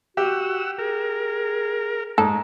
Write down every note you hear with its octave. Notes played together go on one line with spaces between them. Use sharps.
F#4 G4 F#5 E6
G#4 A#4
G#2 A4